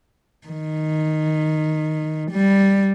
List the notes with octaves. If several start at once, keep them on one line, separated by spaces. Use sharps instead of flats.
D#3
G3